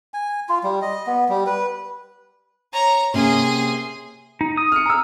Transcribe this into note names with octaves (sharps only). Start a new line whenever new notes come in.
G#5
F4
G3
D#5
B3
G3
B4
C#5 A#5
C3 A#3 C#4 G#4 C6
D#4
D#6
F6 C#7
A#5 E6